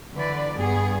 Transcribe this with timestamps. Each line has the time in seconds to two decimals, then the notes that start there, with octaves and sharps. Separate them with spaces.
0.15 D3 E3 B4 D5
0.54 G2 B3 G#4